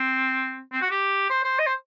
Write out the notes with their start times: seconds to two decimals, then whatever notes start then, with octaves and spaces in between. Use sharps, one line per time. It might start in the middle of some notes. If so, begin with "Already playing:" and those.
Already playing: C4
0.73 C4
0.82 F#4
0.91 G4
1.30 C5
1.44 C5
1.59 D#5
1.67 C5